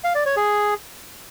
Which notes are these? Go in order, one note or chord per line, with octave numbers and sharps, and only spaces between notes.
F5
D5
C#5
G#4